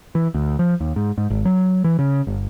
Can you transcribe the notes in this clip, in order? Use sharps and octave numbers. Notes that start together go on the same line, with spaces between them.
E3
D2
F3
D#2
G#2
G#2
G#1
F#3
E3
C#3
G1